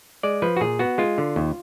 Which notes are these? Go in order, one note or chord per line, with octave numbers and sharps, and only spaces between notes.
G#3 D5
F3 B4
F#4
A#2 G#4
B3 F#4
G#3 F4
D3
D#2